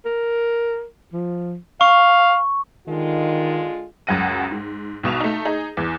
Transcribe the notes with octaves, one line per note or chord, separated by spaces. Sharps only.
A#4
F3
F5 C#6
D3 D#3 G#3 F4
C#2 F#2 F#3 F#5 A#6 D#7
G#2
B1 B2 E7 F7
A3 D#4
D#4 G#4
E2 E3